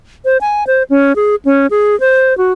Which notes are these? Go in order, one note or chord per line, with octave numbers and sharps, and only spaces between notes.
C5
G#5
C5
C#4
G#4
C#4
G#4
C5
F#4